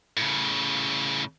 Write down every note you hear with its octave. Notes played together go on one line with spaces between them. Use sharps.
A2 C#3